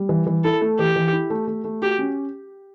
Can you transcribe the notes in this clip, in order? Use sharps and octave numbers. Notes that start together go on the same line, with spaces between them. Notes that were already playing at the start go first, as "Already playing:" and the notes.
Already playing: G3
E3
E3
E4 A4
A3
E3 G4
E3
E4
A3
A3
A3
F#4 G4
C#4